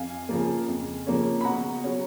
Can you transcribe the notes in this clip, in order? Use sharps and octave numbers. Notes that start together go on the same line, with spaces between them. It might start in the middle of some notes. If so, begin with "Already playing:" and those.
Already playing: F2 F5 G#5
C#3 F3 A#3
F2
C#3 F3 A#3 C#4
B5
B2 F#5 A#5
F#3 C#4